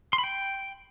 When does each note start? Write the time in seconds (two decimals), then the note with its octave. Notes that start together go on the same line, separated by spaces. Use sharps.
0.13 C6
0.18 B5
0.24 G5